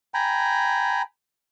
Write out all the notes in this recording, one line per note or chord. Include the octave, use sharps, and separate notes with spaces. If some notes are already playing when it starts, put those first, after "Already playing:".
G5 G#5 A#5 B5